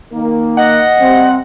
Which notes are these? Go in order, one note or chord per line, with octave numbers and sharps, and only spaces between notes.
D#3 A#3
D#5 F#5
C3 G3 C4